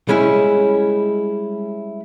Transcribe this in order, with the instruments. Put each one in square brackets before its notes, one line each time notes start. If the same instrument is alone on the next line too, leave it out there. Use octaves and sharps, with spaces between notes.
[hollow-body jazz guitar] G3 G#3 C#4 E4